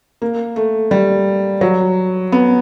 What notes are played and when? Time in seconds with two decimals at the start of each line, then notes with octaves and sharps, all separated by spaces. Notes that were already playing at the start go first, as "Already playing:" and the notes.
0.22 A#3
0.56 A3
0.91 G3
1.61 F#3
2.32 B3